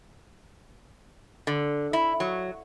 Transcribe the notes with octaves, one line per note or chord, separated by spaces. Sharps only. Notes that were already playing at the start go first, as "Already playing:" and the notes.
D3
E4
F#3